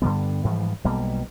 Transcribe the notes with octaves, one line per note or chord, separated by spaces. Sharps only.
G2 D3 G3 B3
G#2 E3 F3 G3
B1 B2 G3 A#3